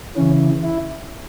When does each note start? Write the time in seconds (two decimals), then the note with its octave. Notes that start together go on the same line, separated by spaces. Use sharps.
0.16 C#3 E3 C#4
0.64 E4